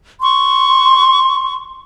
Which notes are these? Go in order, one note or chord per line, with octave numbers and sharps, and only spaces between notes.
C6 C#6